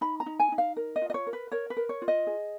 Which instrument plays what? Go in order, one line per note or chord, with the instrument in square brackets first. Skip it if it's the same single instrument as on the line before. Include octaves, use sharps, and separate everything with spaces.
[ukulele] D#4 B5
A#5
D#4
G#5
D#4
F5
A#4
D#5
F4
D#5
C#5
A#4
B4
A#4 C#5
B4
A#4
C#5
F4
D#5
G#4